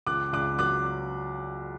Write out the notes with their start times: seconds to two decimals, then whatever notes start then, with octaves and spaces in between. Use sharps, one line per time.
0.07 C#2 D6 F#6
0.33 C#2 D6 F#6
0.59 F#3 D6 F#6